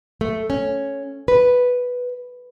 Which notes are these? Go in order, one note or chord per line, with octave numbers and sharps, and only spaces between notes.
A3
C#4
B4